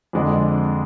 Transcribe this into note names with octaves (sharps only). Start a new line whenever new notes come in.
F2 D3 G#3 D4